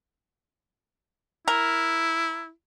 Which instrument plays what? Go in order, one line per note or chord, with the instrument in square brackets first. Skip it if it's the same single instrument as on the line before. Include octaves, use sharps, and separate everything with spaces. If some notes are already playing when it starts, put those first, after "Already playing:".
[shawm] E4 [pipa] A#4